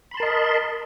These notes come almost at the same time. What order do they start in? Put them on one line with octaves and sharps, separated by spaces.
B5 C6 A5 A#4 D#5